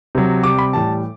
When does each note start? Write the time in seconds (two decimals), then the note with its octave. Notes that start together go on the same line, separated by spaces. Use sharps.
0.15 C3 F#3
0.43 C3 G3 D6
0.58 B5
0.73 A2 E3 G3 A5